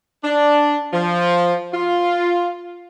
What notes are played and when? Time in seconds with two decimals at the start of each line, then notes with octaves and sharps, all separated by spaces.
0.24 D4
0.94 F3
1.73 F4